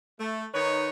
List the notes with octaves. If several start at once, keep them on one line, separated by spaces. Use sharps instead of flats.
A3
D#3 D#4 B4 C#5